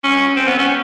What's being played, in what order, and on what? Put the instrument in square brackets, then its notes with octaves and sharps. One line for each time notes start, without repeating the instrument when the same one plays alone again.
[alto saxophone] C#4
C4
B3
C#4